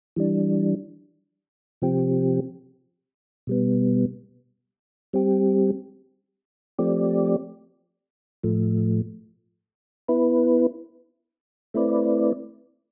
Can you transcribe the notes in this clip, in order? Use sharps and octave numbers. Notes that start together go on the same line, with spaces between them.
E3 G3 D4
C3 F3 C4 G4
B2 G3 B3
G3 C4 G4
F3 A3 C4 G4 D5
A2 F3 A3
B3 E4 B4
A3 C4 E4 B4 D5